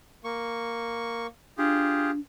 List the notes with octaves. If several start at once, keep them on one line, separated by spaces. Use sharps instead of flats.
A#3 C#6
D4 F4 G4 G#4